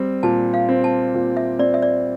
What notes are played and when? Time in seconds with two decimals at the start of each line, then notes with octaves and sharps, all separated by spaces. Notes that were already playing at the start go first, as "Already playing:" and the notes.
Already playing: G3 C4
0.23 A#2 A5
0.54 F5
0.69 C4
0.84 A5
1.15 A#2
1.37 E5
1.59 C4 D5
1.74 E5
1.82 D5